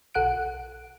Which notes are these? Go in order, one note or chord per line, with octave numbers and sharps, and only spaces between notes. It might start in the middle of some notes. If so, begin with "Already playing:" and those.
B1 A4 F#5 F#6 D7